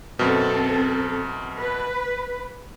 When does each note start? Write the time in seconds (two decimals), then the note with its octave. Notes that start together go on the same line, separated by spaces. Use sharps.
0.19 F#2 B2 C4 A4
1.59 B4